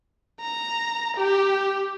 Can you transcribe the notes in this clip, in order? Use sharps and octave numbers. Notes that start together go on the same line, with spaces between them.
A#5
G4